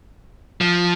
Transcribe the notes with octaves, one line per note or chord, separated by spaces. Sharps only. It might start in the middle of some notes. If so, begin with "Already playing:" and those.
F3